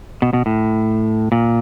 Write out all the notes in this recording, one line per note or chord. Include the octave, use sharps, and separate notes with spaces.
B2
B2
A2
A#2